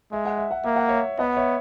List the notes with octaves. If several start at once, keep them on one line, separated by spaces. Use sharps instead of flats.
G#3 E5
F#5
E5
F#5
A#3 E5
F#5
C#5 E5
B3 D#5 F#5
C#5 E5